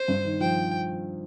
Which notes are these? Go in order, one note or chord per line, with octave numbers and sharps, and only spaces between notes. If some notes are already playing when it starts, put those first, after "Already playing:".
Already playing: C5
G2
D#3
F3 G5